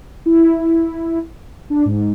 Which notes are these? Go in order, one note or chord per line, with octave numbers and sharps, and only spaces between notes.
E4
D4
G#2